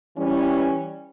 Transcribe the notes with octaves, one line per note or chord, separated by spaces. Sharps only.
E3 G3 C#4